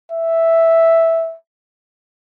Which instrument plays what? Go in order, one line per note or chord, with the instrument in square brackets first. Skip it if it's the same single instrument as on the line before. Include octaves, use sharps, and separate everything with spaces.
[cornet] E5